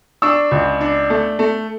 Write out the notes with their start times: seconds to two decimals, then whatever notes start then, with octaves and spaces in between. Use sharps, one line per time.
0.22 D4 C#6 E6
0.51 C#2
0.81 D4
1.10 A3
1.39 A3